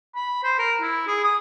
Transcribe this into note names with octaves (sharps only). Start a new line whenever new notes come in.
B5
C5
A#4
E4
G#4
D#6